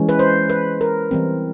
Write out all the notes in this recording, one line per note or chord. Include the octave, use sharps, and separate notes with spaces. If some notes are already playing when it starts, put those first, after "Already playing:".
Already playing: E3 G#3 C#4
B4
C5
B4
A#4
E3 G3 C4